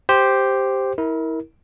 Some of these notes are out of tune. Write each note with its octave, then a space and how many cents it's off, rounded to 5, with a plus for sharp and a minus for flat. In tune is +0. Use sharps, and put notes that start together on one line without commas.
G4 +0 C5 +0
E4 -30 A#4 +0